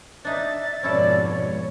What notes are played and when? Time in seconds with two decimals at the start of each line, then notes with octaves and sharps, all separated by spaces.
0.25 D4 D#4 E5 A6
0.83 F2 G#2 B2 C#4 E4 A4 D5
1.23 C#5